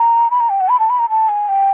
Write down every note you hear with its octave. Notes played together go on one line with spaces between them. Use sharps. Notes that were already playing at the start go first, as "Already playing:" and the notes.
Already playing: A#5
B5
A#5
G5
F#5
B5
A5
B5
A#5
A5
G#5
G5